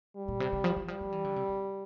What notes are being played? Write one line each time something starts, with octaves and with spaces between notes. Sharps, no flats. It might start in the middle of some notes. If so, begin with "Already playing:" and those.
G3
A#2
C3
C3
F3
E3
F3 G3
F3
E3
D3
C3
C3